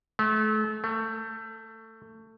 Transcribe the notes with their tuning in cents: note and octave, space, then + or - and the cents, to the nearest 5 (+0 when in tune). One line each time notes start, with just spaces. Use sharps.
A3 -35
A3 +20